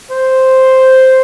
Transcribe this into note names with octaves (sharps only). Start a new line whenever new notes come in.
C5